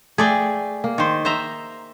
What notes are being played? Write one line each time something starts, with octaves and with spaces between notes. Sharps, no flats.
A3 G#4 D5 G5
A#3
D#3 C5
C5 E5 A#5